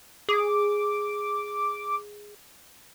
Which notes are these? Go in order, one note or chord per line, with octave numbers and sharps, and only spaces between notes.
G#4 D6